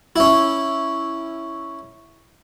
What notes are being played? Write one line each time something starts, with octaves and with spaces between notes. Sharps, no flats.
C#4 E4